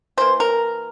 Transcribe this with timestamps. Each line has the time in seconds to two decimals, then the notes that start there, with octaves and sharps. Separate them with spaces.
0.17 E3 A#3 C5
0.40 A#4